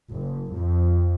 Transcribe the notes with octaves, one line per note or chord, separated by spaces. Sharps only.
F#1
F2